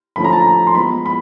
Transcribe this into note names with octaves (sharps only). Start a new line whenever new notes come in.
D3 F3 A3 C#4 B5
A#5
A5
A#5
C6
F3 G#3 B3 B5
B5